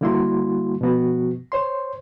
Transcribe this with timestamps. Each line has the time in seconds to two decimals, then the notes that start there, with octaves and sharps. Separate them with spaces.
0.01 D3 G3 A#3 E4 F#4 C6
0.81 B2 F3 B3 F#4
1.52 C5 C#5 C6